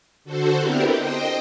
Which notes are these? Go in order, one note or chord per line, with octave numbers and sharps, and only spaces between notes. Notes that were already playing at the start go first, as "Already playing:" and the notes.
D3 F#4 A4 C5
B3 C4 D4 E4 G4 A#4
C5 D#5 G5